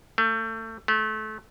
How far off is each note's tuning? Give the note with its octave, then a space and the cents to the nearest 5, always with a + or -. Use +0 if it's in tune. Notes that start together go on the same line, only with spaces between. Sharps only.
A3 +30
A3 -25